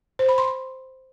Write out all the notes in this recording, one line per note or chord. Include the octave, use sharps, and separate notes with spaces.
C5
B5
C6